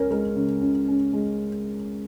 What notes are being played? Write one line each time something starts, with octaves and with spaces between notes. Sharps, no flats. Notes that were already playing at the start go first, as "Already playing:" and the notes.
Already playing: C#2 C#4 A#4 C#5
G#3 A#4
C#3
C#2
C#4
G#3